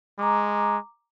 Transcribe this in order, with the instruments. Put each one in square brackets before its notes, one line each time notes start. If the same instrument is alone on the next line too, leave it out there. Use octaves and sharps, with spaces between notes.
[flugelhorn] G#3 [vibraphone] A#5 D6